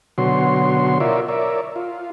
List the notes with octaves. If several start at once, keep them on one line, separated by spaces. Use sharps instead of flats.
B2 D3 F#3 F#4 C#5 C6
E4 F4 A#4 C#5 D5 E5
A#4 C#5 D5 E5
F4